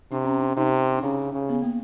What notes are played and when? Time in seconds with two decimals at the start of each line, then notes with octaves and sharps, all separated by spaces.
0.12 C3 D4
0.25 C#4
0.39 D4
0.57 C3 D#4
0.97 D4
1.03 C#3 C#4
1.34 C#3
1.49 B3
1.62 A#3